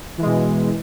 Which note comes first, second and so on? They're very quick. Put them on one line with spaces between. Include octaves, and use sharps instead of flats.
E3 G#3 B2